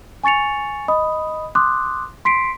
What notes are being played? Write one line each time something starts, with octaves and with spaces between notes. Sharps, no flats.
G#5 C#6 A6 C#7 F7
D#5 B5 D#6
C6 D6 D#6 F#6
C6 B6 C7 D7